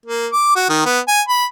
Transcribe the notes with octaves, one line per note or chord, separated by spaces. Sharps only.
A#3
D6
F#4
D#3
B3
G#5
B5